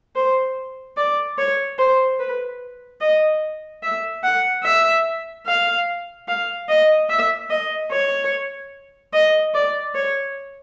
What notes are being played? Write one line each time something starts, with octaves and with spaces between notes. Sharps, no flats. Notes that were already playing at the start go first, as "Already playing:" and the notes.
C5
D5
C#5
C5
B4
D#5
E5
F#5
E5
F5
F5
D#5
E5
D#5
C#5
D#5
D5
C#5